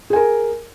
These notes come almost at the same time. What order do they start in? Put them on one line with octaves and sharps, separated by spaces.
G#4 G#5 A#4